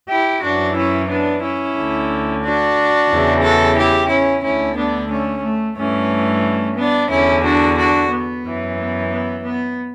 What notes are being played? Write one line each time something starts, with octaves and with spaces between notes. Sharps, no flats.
E4 G4
F#2 E3 D4 F#4
C#4 E4
B3 D4
C#4 E4
D2 D3
D4 F#4
E2 C#3 E3
F#4 A4
E4 G4
C#4 E4
D2 D3 C#4 E4
B3 D4
A3 C#4
A3
G2 E3 A3 C#4
B3 D4
E2 D3 C#4 E4
D4 F#4
D4 F#4
B3
F#2 E3
B3
B3
B3